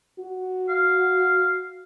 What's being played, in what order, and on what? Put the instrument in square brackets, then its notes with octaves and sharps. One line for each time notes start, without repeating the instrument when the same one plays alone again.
[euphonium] F#4
[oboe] F5